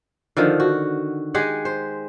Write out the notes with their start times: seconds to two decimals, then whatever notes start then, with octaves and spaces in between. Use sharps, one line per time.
0.37 D3 D#3 F3
0.60 F#4
1.34 G#3 G4 G#4 F#5
1.65 C5